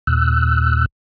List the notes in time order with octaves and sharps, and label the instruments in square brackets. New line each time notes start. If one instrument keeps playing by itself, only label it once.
[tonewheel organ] D#2 A#2 E6 F#6